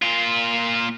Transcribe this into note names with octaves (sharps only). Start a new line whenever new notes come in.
A#2 F4